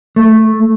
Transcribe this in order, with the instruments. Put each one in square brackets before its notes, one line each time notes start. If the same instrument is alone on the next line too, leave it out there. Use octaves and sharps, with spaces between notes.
[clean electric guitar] A3